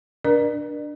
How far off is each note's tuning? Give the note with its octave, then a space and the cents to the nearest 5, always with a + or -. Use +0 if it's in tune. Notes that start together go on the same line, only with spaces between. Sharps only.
D4 +0 A#4 +40 D5 +40